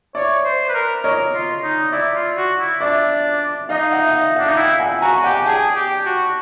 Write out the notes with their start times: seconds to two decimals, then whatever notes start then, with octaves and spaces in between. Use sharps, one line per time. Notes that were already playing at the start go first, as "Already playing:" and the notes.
0.15 C#5 D5 E5
0.44 C5
0.69 B4
0.75 A#4
1.03 A#4 C#5 D#5
1.34 F4
1.63 D#4
1.92 E4 D5 E5
2.14 F4
2.37 F#4
2.59 E4
2.81 D4 D5 E5
3.69 D#4 D#5 F5
3.92 E5 F#5
4.08 E5
4.14 D#5 F5
4.36 D4 E5 F#5
4.49 D#4
4.58 E4 F5 G5
4.80 F#5 G#5
5.02 F#4 G#5 A#5
5.24 G4 F#5 G#5
5.46 G#4 G5 A5
5.76 G4
6.06 F#4